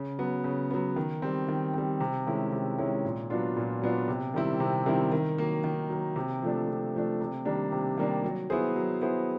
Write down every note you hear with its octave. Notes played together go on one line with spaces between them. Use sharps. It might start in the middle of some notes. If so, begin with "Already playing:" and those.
Already playing: C#3
F#3 B3
C#3
F#3 B3
D#3
G3 C4
D#3
G3 C4
C3
D#3 G#3 C#4 E4
C3
D#3 G#3 C#4 E4
A#2
F#3 B3 D4 F4
A#2
F#3 B3 D4 F4
C3
D#3 G3 C4 E4
C3
D#3 G3 C4 E4
D#3
F#3 A#3
D#3
F#3 A#3
C3
F3 A3 D4
C3
F3 A3 D4
C3
D#3 G3 A#3 D4
C3
D#3 G3 A#3 D4
F#3
B3 E4 G#4 C5
F#3
B3 E4 G#4 C5